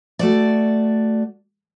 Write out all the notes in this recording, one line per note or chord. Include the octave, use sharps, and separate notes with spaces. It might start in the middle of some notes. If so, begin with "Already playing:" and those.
A3 F#4 D5